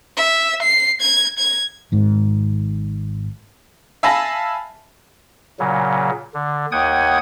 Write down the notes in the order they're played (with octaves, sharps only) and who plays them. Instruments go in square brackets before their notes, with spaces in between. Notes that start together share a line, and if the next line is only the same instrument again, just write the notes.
[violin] E5
C7
G#6
G#6
[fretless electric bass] G#1 G#2
[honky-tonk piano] E5 F5 G#5 A5 B5 A#6
[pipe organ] A#2 C#3 F#3
D3
D#2 F#5 G5 D#6 G#6